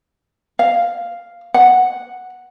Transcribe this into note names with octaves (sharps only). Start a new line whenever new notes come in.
F5
F#5